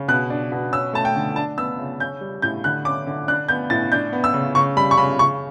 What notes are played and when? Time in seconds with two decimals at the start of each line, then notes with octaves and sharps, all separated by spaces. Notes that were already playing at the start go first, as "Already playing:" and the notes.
Already playing: C#3
0.08 B2 F#6
0.30 D4
0.52 B2
0.73 C#4 E6
0.93 A3 A5
1.05 G5
1.16 D3
1.36 D4 A5
1.58 B3 E6
1.79 C#3
2.00 C#4 G6
2.21 G3
2.42 A2 G6
2.64 D3 F#6
2.85 C#4 D6
3.06 D3
3.28 D4 F#6
3.48 B3 G6
3.70 A2 A6
3.92 D4 G6
4.13 B3
4.24 E6
4.34 C#3
4.55 C#3 C#6
4.77 G3 B5
4.91 C#6
4.97 C#3 B5
5.19 C#3 C#6